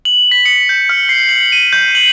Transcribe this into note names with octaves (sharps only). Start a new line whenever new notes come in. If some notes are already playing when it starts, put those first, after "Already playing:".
F#7
B6
C#7
G6
F6
C7
F#7
D#7
G6
F#7